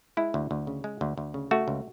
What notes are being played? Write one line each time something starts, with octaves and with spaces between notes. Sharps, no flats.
G#3 E4
D2
D2
C#3
G#3
D2
D2
C#3
A3 F#4
C#2